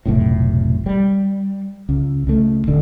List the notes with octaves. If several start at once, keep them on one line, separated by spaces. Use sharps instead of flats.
F1 B1 A2
G3
C#2
C#2 A3
D#1 D3